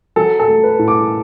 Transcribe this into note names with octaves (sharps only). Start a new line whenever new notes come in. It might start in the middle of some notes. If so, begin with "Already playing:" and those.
F#3 A4
A4
A3
B4
A2
D6